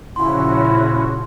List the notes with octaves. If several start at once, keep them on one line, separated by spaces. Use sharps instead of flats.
A#2 C#3 F3 C#4 E4 F#4 C6